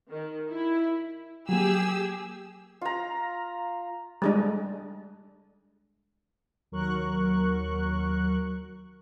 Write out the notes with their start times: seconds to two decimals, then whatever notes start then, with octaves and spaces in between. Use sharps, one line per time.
0.11 D#3
0.50 E4
1.49 F#3 A#3 G4 G#4 E6
2.81 F4 A#5
4.22 G3 G#3 D4
6.72 D#2 F#3 A#4 C#6 F#6